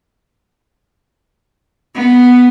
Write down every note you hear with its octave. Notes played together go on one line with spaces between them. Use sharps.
B3